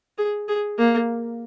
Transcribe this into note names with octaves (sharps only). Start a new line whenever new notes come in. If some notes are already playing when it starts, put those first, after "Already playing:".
G#4
G#4
A#3